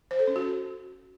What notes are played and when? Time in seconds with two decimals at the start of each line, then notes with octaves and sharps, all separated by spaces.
0.11 C5
0.19 A4
0.27 C#4
0.36 F#4